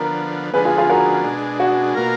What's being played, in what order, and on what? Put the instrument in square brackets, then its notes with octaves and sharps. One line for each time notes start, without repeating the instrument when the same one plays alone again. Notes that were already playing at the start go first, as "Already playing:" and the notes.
Already playing: [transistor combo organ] D3 F3 B3 [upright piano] A#4
[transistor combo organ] D3 F3 G#3 B3 [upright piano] G#4 B4
[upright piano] F4 G#4
F4 G#4
F#4 A#4
[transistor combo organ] B2 G#3 D4
[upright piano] F#4
[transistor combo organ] B2 A#3 F4 A#4